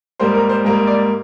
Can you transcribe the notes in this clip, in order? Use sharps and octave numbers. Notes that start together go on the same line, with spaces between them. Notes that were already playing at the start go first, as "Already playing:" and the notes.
G#2 G3 A#3 C5
A#4
C5
G#2 G3 A#3 A#4
D5